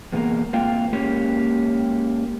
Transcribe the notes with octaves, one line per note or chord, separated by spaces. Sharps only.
E2 B2 D3 G#3 A#3 A#4
G#3 A#3 C4 F4 G5
G#3 A#3 C#4 G4 C#5